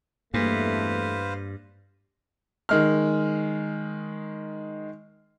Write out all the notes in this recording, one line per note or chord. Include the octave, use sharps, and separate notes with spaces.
E2 G2 A3 A#3 B4 C5 F5
D#3 G#3 F6